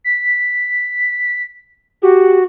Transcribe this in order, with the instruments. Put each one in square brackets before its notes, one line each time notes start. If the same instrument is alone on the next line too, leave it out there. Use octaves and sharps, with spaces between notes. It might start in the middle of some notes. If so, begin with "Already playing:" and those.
[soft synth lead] B6
[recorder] F#4 [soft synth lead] G4